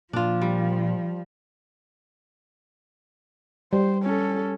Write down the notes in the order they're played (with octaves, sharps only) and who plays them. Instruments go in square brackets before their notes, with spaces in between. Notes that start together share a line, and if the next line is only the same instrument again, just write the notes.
[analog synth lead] A#2 [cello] F3 [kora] D4 F4
[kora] G3
[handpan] G3 [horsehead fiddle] C5
[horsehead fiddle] C#4 A4